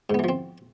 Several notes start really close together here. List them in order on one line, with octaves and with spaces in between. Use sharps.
G#2 B3 E3 F3 C4